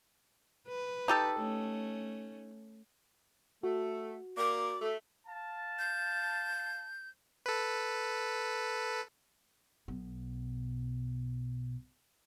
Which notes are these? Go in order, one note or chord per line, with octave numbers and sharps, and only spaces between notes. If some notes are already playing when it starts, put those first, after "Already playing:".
B4
D#4 G4 A4
A3 C#4
A3 F#4
A#3 A#4 D5 D6
A3
F5 A5
G6
A4 B4
B1 B2